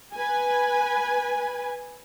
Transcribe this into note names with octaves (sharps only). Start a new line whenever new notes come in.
B4 G#5